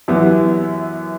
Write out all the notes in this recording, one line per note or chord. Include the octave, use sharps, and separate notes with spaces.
F#2 E3 B3 E4 G4